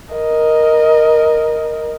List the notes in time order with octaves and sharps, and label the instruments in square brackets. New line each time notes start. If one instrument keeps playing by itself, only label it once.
[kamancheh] A#4 D#5